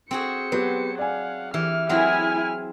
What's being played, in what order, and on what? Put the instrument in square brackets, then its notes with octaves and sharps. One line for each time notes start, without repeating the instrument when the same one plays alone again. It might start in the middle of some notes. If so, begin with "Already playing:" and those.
[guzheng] C4 F#4 G#4 [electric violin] C5 C#7
[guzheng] F#3 [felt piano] B3 G4
[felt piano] D5 G#5 [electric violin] F5 F#5
[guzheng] E3 [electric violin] G4 F6
[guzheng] F#3 C4 G#4 [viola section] E4 G#5 [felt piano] F#5 [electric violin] F6